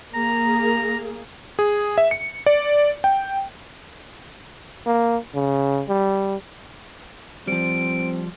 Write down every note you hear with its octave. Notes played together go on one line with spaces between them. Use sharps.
A#3 G#4 A#5
G#4
E5
C#7
D5
G5
A#3
C#3
G3
F3 G3 C4 D7